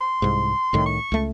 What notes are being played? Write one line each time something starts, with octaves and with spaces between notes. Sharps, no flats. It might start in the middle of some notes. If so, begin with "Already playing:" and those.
C6
C2 G#2
C2 A2 D#3
C#6
C#2 A3